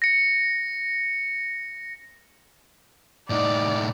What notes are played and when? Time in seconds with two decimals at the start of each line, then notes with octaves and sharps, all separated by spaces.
0.02 A#6 C#7
3.30 A2 D#4 D5